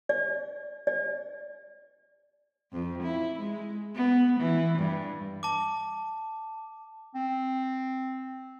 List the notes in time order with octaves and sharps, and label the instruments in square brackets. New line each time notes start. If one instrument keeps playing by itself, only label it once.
[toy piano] D5
D5
[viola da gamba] F2
E4
G#3
B3
E3
G2
[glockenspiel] A5 D6
[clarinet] C4